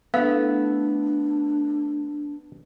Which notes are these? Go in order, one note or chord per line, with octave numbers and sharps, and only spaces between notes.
A3 B3 D4 E4 F#4 F5